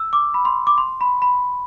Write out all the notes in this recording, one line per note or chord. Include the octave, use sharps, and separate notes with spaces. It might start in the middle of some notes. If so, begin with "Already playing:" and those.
Already playing: E6
D6
B5
C6
D6
C6
B5
B5